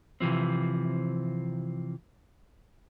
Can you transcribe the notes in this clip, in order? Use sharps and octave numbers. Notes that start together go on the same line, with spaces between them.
C3 E3 F3 C4